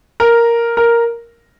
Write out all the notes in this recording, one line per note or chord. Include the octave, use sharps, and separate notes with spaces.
A#4
A#4